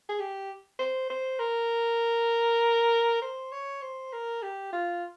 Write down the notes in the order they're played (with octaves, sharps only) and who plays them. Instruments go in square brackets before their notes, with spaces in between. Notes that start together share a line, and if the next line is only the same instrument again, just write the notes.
[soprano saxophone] G#4
G4
C5
C5
A#4
C5
C#5
C5
A#4
G4
F4